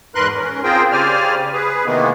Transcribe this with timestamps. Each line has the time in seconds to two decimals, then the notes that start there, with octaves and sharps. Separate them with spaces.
0.15 E2 G#2 A#4 B4 C6 F#6
0.36 C#4 A#4
0.64 C4 F4 G#4 A#4 C5 G5
0.92 C#3 G4 C5 D5 G#5 F6
1.53 G#4 B4
1.86 C3 D#3 E3 G#3 A#3 B3